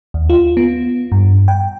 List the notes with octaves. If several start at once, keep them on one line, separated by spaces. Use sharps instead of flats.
D#2
F4
B3
G2
G5